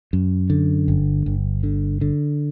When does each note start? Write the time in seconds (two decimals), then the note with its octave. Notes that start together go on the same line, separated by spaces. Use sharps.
0.13 F#2
0.50 D3
0.88 G1
1.26 G1
1.63 D3
2.01 D3